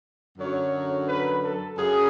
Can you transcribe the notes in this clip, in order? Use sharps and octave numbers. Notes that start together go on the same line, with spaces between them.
F#2 D3 F#3 C#5
B4
A4
F#2 C#3 G#4